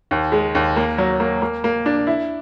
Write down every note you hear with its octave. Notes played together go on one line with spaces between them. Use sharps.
D#2
G#3
D#2
A#3
F#3
A#3
A#3
A#3
D4
E4